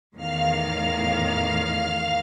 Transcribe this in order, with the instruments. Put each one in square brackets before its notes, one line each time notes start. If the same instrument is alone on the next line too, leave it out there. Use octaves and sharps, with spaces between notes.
[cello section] E2 A2 D#3 [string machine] F5 F6